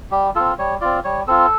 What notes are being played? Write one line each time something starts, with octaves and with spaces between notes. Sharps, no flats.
G3 G4
C4 F4 A4
G3 C#5
C4 F4 D5
G3 C#5
C4 F4 A4